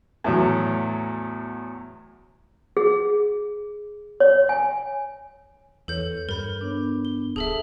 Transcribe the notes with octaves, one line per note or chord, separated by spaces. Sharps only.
E2 A2 F#3
G#4
C#5
G#5
E2 A4 B4 C#5 G6
G2 A#4 B5 G6
B3 D4
G7
D1 G#4 A4 E5 A5